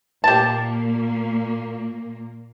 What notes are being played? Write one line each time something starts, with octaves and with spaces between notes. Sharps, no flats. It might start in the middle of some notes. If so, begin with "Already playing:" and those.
A#2 A#3 G4 A5